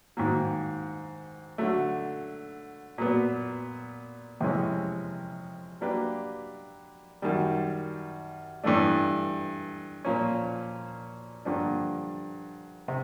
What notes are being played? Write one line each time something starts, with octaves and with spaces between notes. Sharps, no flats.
G#2 D#3 F#3 A#3
D3 F#3 A3
A#2 F#3 B3
F2 C3 E3 G#3 C#4
F#3 A#3 D4 G4 B4
F#2 D#3 G3
G2 E3 A3 D4
A#2 F3 A#3 C#4
G2 D3 F3 A#3 D4
C3